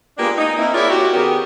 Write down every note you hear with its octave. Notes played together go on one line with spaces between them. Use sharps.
G#3 A#3 B3 D4 F4 G4
D#4
A#3 C4 E4
E4 F4 G#4 A#4 C#5 D5
F#4 G4
D#3 B3 C#4 G4 G#4 A#4